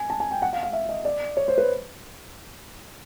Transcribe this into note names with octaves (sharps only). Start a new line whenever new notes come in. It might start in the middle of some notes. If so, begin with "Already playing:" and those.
Already playing: G#5
A5
G#5
G5
F#5
F5
F5
E5
D#5
D5
C#5
C5
B4